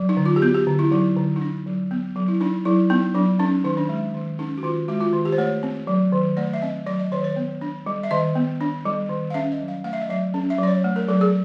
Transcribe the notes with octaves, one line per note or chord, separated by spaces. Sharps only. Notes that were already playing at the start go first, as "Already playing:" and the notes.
Already playing: F#3
D#4
D3
F4
G4
B3 F#4
G4
D3
E4
F#3 D#4
D3
D#4
D4
F#3
B3
F#3
E4
D4 D#4
F#3 E4
B3 D#4
F#3 D4
C#4 D#4
D#3 D#4
D4
G#3
D#3
C#4 D#4
F#4
D#3 F4
G#3 F#4
F4
D#3
G4
C5
A3 C#5
C4
F#3
D#3
A3 D5
E5
C4 D#5
F#3 D5
D#5
D#3 C#5
C#5
B3
D4
G3
E5
D#3 D#5
B3
D4
G3
D#3
F5
C#4 E5
D#5
F#3
F5
A3 F5
E5
D#5
F#3 E5
C#4
E5
F#3 D5
C#5
A3
A#4
F#3 A4
G#4